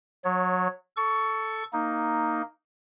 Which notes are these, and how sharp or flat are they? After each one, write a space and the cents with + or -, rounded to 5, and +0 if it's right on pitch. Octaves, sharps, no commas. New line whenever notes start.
F#3 -25 C#5 +0
A4 +0 C#6 +15
A#3 +0 D#4 +0